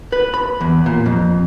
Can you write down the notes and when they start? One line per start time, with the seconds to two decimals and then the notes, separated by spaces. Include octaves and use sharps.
0.12 B4
0.34 B5
0.61 E2
0.86 A#2
1.06 F2